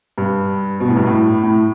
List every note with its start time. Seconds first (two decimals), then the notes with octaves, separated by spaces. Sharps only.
0.18 G2
0.80 B2
0.88 A2
0.96 G2
1.06 A2
1.43 A2